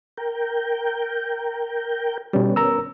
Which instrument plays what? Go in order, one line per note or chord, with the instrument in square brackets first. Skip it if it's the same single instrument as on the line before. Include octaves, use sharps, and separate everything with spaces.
[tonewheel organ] A#4 G5
[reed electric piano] B2 G3 [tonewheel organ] B3 C#4
[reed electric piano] A#4 A#5 E6